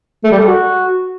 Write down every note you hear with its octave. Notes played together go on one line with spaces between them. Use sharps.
A3
G3
A4
F#4